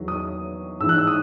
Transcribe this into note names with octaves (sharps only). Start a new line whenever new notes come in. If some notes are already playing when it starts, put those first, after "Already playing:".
Already playing: E2 D#3 F#3
D#6
G#2 E3 E6
F#6
E6
D#6